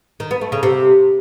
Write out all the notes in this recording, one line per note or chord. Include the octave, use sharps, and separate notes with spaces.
D#3
B3
A3
C#3
C3